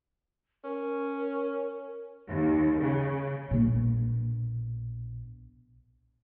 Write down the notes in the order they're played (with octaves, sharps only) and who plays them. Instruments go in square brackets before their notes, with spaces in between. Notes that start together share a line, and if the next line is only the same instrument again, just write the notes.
[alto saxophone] C#4 [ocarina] A#4
[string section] D#2
C#3
[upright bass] A#1 B2